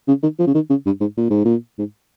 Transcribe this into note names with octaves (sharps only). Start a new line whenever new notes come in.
C#3
D#3
F3
C#3
D#3
C#3
G2
G#2
A#2
G#2
A#2
G#2